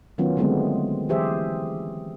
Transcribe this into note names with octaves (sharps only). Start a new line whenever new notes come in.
D#3 F#3 B3 C#4 F4
D3 F#3 G#3 A3 B3 C4
E3 F#3 G4 G#4 C5 E5